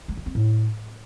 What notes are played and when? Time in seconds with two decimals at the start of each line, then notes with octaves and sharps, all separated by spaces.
0.08 G#3
0.17 G3
0.26 C4
0.35 A2